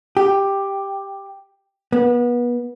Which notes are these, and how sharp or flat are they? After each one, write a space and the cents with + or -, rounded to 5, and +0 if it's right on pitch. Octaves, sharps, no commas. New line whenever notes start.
G4 +5
B3 -30